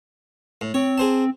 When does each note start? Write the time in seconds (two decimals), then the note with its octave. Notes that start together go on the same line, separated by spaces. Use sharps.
0.61 A2
0.74 C4 C#5
0.98 G#4 C5 A5